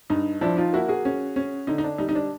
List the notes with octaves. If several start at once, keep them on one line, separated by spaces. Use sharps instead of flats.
G2 D#4
F3 D4 E4
D#4 F4
A#3 E4 F#4
F#4 G#4
C#4
C#4
D3 D#4
D#4
D4
G3 D#4
D#4
D4